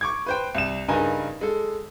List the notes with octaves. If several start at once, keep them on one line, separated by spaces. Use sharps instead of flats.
C#6 D6 G#6
B4 C5 G5
C2 E7
G2 C#3 D#4 A#4 B4 G#5
G#3 A4